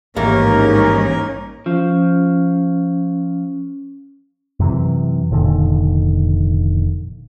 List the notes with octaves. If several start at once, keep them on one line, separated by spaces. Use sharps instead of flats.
A1 D#2 G#2 E3 A#3 C#4 D#4 A#4
F3 C#4
F#2 C3 E3
F1 A#2 D3 D#3